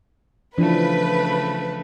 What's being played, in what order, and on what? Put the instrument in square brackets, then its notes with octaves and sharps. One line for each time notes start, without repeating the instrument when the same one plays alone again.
[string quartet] C#3 A3 [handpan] E3 F3 D4 [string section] B4